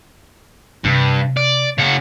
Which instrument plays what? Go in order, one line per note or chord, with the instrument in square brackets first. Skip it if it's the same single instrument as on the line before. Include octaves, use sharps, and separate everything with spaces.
[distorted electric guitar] G2 [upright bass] C3
[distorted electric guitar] D5
C#3 F#5